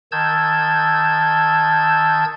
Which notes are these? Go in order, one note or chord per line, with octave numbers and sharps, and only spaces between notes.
D#3 A5 E6 G6 G#6